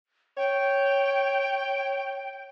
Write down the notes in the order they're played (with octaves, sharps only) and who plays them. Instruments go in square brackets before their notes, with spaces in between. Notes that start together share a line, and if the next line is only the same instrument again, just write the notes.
[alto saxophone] C#5 [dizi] G5